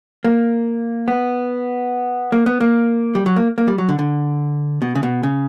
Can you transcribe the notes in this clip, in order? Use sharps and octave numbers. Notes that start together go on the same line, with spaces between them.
A#3
B3
A#3
B3
A#3
G3
F#3
A#3
A#3
G3
F#3
D3
D3
B2
C#3
B2
C#3